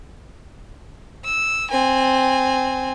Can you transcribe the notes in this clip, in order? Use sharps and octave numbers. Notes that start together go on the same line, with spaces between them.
E6
C4 G#5